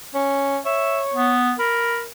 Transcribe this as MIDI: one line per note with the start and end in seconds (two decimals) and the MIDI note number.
0.15 0.58 61
0.66 1.35 73
0.66 1.01 76
1.14 1.53 59
1.59 2.08 70
1.59 2.00 83